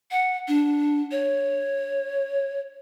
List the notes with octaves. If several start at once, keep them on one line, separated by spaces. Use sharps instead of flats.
F#5
D4
C#5